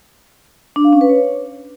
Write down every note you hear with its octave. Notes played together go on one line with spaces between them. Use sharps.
D4
F5
C#4
B4
C#5